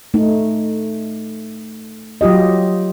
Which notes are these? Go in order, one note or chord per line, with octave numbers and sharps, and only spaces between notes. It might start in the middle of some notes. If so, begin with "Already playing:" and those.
A3 D#4
F#3 F4 G4 D#5